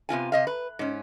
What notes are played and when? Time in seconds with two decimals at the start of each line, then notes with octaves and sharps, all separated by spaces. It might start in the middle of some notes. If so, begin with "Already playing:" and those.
0.09 C3 B3 F4 G#5
0.32 C3 D#5 F5
0.47 B4
0.79 G#2 C#4